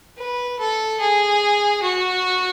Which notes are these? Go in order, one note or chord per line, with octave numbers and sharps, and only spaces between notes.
B4
A4
G#4
F#4